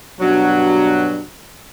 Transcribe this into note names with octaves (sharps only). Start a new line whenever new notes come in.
G2 B2 F#3 D4